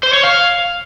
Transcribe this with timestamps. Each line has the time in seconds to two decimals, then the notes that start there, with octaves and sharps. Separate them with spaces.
0.03 C5
0.13 C#5
0.23 F5